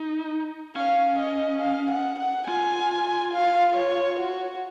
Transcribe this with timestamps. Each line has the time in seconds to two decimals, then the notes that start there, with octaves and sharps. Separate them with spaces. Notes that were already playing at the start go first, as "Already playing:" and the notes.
Already playing: D#4
0.76 C#4 F5
1.19 D#5
1.62 F5
1.91 F#5
2.20 F#5
2.48 F4 G#5
3.34 F5
3.77 C#5
4.20 F#4